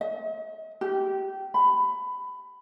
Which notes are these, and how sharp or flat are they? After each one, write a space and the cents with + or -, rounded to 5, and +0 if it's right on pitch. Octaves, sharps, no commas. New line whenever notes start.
D#5 +45
G4 -20
B5 +15